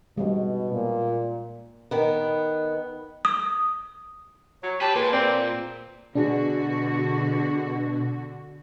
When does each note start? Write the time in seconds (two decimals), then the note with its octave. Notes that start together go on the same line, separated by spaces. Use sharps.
0.17 B2 G3 G#3
0.73 A#2
1.91 D#3 B3
3.25 D#6
4.63 F#3 C#5
4.81 G4 B4 A5
4.95 A#2 G#3 B4
5.12 C4 D5
6.15 B2 D3 D4 F#4 G#4